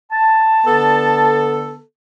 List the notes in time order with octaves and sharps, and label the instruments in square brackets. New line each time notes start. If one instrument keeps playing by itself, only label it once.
[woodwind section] A5
[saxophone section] D3 B3 A4